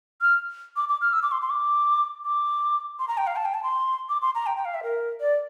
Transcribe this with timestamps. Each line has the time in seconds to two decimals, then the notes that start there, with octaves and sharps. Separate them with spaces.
0.22 F6
0.76 D6
0.89 D6
1.01 F6
1.13 E6
1.23 D6
1.32 C6
1.42 C6
1.50 D6
2.25 D6
2.99 C6
3.08 A#5
3.18 G5
3.27 F5
3.36 A5
3.45 G5
3.54 A5
3.63 C6
4.09 D6
4.22 C6
4.35 A#5
4.46 G5
4.57 G5
4.65 F5
4.74 E5
4.83 A#4
5.20 D5